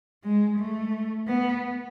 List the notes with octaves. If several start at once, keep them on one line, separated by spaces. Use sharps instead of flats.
G#3
A3
B3